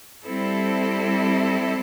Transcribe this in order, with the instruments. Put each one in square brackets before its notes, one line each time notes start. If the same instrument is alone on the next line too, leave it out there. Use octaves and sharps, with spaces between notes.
[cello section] G3 C4 E4 A4